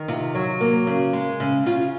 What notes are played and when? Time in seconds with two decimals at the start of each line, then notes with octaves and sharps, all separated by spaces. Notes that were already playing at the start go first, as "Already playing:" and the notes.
Already playing: D#3
0.08 C3 F4
0.35 F#3
0.61 A#3
0.87 C#3
1.13 G#3
1.40 C#3
1.66 C#3 F4